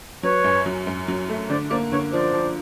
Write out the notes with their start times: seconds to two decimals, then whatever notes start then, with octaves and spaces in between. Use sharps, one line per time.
0.23 F#3 B4 C#5
0.44 F#2
0.66 F#3
0.87 F#2
1.08 F#3
1.29 A3
1.49 D3 C5 D5
1.70 A#3 C5 D5
1.92 D3 B4 C#5
2.13 F3 C5 D5
2.34 F3